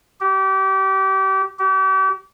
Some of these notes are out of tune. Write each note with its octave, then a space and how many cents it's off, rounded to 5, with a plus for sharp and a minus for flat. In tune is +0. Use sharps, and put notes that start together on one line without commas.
G4 -30
G4 -40